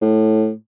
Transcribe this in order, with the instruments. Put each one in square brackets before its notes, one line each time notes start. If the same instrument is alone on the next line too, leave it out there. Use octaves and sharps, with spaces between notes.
[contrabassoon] A2